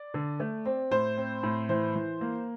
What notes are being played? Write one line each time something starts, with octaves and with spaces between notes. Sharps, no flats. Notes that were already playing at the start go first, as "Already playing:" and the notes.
Already playing: D5
D3
A3
C4
A2 C5
C4
A2
E3 C5
E3
A#3